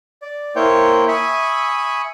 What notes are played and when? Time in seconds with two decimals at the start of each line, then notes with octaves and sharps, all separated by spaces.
0.22 D5
0.56 A#3 E4 C5 C#5 G5
1.08 E5 G#5 B5 C#6 D#6